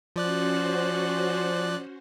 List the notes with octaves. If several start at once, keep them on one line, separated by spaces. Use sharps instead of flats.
F3 C#4 F#4 C5 D5 F#6